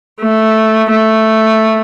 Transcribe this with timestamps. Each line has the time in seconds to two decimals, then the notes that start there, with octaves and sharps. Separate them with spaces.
0.21 A3
0.91 A3